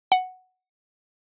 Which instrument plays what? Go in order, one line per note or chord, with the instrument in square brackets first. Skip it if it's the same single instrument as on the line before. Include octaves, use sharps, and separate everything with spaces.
[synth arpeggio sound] F#5